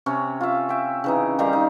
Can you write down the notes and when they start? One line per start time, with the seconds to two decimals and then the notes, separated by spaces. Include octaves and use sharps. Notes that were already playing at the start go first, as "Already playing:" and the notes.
0.06 C3 C#4 C#5
0.41 F4 E5
0.69 E5 G5
1.04 C#3 E3 D#4
1.39 D#3 G3 F5 A#5
1.53 D#4